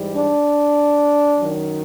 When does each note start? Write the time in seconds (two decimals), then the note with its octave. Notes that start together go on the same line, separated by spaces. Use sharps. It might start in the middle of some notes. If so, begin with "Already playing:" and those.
Already playing: G#2 E3 G3
0.16 D4
1.39 F#2 D#3 F#3